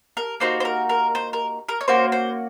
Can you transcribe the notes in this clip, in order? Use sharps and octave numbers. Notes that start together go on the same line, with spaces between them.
A#4
A#3 D#4 F#4 C5
C5
A#4
A#4
C5
A#4
A#4
C#5
A#3 C#4 F#4 C5
C5